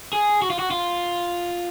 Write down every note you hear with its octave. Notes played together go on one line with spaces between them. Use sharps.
G#4
F#4
F4
F#4
F4